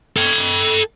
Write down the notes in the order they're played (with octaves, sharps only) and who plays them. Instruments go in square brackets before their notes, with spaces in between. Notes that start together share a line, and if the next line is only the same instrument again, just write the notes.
[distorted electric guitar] A4 G5